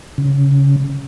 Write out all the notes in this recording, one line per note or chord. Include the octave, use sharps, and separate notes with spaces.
C#3